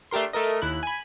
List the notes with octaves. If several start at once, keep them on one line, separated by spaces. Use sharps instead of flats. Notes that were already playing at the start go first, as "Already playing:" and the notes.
A3 D4 G4 A#4 C6
A3 A4 A#4 D#5
D#2 E4 F#6
G#5 B5